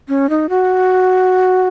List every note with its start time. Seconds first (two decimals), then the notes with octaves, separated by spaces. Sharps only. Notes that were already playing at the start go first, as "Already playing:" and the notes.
0.08 C#4
0.29 D#4
0.49 F#4